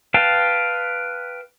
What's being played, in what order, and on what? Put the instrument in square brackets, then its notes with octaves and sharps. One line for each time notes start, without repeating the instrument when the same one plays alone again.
[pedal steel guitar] B4 F5 G5 A5